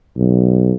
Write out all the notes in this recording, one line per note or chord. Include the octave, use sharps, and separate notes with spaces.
B1